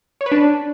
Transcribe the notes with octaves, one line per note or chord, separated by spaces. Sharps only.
C#5
B4
D4